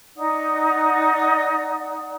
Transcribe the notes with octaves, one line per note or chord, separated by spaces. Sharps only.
D#4 D5 F#5 D#6